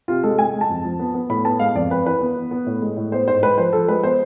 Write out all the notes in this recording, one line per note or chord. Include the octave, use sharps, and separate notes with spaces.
C3 F4
G#3 A4
G#3 G#5
G#3
A5
F2
F3
B3
B3
A2 B5
B3 A5
G#3 F5
F2 D5
F2 B4
E3 B4
B3
B3
B3
A2
G#3
A2
B3 C5
G#2 C5
G#3 B4
F3 C5
F3 A4
G#3 B4
B3 C5